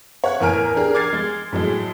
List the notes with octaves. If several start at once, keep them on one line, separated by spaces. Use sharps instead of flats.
C#5 F#5
E2 A2 A#4 G#5 F6 D7
D4 G4 G#4 A#4
D6 F6 G#6 A6 C7
G#3 A6
A2 F#3 G#3